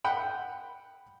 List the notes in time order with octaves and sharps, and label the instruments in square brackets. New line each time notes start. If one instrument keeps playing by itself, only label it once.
[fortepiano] F#5 G5 B5